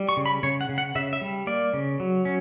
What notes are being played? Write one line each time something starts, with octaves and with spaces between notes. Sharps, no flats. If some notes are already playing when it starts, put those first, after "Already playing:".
Already playing: G3
C#6
C#3
B5
C#3 C#5
F#5
C#3
F#5
C#3 E5
E5
G3
A#3 D5
C#3
F#3
C#4